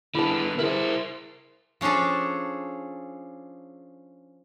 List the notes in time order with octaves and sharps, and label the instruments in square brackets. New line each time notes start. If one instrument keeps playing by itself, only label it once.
[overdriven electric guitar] D3 B3 [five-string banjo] E4 G#4 A5
[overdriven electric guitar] E4 C5 [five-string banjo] G#4 A#4
[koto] F3 C#4 D4 G#4 A4